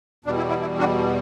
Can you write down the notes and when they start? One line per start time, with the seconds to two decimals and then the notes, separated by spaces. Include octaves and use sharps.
0.25 E2 B2 G3 D4
0.37 E4
0.49 E4
0.61 E4
0.79 D4 F#4